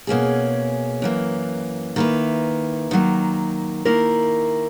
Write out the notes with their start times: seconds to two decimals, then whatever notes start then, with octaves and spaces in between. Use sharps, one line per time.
0.07 B2 A#3 C#4 G#4
1.02 F#2 E3 A#3
1.96 D#3 A#3 E4 B4
2.91 D#3 F#3 A#3
3.85 D#3 A#3 E4 A#4